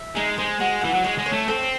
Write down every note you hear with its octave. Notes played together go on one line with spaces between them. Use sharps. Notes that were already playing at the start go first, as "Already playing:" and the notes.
Already playing: E5
G#3 D#4
G#3 C5
G#3 F#4
E3 F#5
F#3
G#3 C#5
G#3
C#5
A3
C4 A4